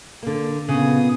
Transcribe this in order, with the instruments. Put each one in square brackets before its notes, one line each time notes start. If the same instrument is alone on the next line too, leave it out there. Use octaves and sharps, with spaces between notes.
[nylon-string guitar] D3 A#3
[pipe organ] A#2 B3 D#6 [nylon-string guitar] C#3